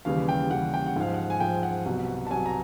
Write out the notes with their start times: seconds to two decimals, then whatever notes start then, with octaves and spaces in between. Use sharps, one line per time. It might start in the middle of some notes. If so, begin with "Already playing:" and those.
0.05 D#2 C#3 E3 G3 F5
0.29 G5
0.51 D#2 C#3 E3 G3 F#5
0.74 G5
0.86 F#5
0.96 G#2 F3 F5
1.14 F#5
1.30 G#5
1.40 G#2 F3 G5
1.63 F#5
1.86 C2 B2 F#3
2.27 A5
2.31 C2 B2 F#3 G#5
2.46 A#5